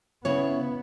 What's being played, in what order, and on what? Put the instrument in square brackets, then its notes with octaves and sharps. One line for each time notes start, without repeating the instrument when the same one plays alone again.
[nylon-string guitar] C#3 E4 C#5 [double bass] B3